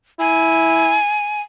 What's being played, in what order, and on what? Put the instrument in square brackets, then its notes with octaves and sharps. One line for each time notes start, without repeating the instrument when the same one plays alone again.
[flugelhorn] E4 [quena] G#5